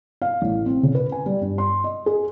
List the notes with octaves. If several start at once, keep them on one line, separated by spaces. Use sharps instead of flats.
F5
A1
C4
C#3
B4
G#5
G3
G2
C6
D#5
G#4